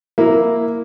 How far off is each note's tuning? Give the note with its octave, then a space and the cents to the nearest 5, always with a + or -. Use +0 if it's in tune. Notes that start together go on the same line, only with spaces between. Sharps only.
A#3 +0 E4 -5